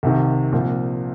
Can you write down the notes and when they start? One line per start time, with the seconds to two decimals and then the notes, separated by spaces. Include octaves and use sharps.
0.03 C2 C3 D#3
0.53 C2 A#2 F3